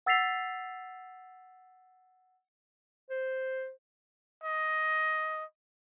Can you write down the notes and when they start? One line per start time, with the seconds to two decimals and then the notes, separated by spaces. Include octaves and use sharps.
0.06 F#5 E6 A6 B6 C7 F7
3.10 C5
4.44 D#5